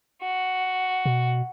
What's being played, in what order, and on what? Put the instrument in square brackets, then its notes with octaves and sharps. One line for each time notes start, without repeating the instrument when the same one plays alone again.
[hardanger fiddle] F#4
[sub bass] B2